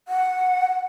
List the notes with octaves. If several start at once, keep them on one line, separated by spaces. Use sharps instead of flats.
F#5